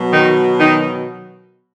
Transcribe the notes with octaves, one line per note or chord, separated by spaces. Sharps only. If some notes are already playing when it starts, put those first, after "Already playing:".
Already playing: B2 F#3
D#3 D#4
D#3 D#4